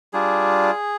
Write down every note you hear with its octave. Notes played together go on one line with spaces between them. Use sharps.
G3 D4 F4 G#4